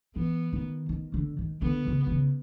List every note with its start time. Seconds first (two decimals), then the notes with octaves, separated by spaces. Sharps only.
0.16 E3 B3
0.53 D#3
0.89 D#3
1.14 D3
1.38 D#3
1.62 D3 B3
1.87 C#3
2.07 C3
2.10 C#3